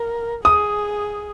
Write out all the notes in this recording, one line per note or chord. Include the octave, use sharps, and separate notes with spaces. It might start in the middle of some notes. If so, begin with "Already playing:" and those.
Already playing: A#4
G#4 D#6